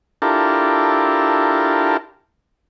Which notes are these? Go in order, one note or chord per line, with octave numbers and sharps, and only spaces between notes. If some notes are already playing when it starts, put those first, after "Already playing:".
D4 E4 F4 G4 A4 A#4